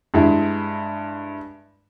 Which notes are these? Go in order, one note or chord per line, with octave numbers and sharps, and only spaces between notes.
G2 G#3 E4